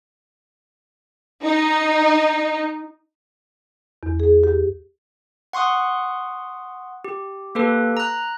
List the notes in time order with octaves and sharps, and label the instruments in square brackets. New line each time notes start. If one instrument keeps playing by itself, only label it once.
[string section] D#4
[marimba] E2
G#4
G4
[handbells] F#5 C6 C#6 D#6 F#6
G4
A#3 G4 A4 B4
A#5 F#6